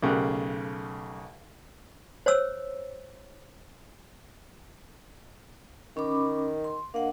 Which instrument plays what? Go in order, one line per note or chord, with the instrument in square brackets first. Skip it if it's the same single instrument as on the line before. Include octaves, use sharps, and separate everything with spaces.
[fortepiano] B1 C#3 A3 G4 A#4 F#6
[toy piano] C5 C#5 E6
[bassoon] D#3 [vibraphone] C#4 B5 D6
[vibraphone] C6
[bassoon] A#3 [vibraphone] D4 D#5 F#5